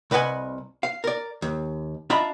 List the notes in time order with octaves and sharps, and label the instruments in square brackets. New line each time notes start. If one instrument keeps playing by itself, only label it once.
[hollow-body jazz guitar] C2 B4 D#5 F#5 G#5
F5
A#4 D5
D#2
D4 F4 D#5 E5 A#5 B5